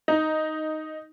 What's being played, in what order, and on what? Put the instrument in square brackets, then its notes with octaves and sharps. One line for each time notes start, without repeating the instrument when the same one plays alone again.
[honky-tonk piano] D#4